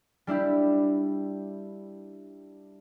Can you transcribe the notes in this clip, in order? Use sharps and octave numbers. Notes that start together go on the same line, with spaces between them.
G3 D4 E4 G4